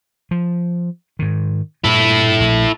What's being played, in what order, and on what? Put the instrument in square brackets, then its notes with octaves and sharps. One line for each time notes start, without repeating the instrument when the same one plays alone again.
[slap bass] F3
G#2 D#3
[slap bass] G2 A#2 [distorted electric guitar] E4 A4
[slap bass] A#1 A#2